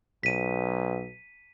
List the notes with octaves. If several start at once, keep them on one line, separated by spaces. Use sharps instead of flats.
B1 B6 D#7